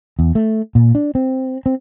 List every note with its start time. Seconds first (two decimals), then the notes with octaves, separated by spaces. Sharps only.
0.19 E2
0.35 A3
0.75 A#2
0.95 D4
1.15 C4
1.66 C4